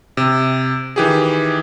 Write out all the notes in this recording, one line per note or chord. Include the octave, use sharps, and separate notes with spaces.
C3
D#3 E3 G4 G#4